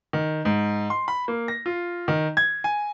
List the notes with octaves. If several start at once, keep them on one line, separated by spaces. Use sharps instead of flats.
D#3
G#2
C6
B5
A#3
A#6
F4
D#3
G#6
G#5